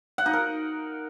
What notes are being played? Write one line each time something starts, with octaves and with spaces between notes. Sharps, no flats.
F#5
D#4
A#4